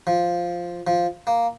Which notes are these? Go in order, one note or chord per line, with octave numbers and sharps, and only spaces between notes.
F3
F3
A#3